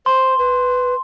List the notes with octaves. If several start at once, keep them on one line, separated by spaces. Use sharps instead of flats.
C5 C6
B4